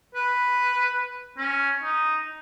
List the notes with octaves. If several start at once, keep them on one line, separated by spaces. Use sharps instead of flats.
B4
C#4
D#4